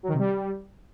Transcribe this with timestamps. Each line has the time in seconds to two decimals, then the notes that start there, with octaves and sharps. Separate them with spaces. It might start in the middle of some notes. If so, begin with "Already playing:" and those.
0.03 F#3
0.08 D#3
0.14 C3
0.19 G3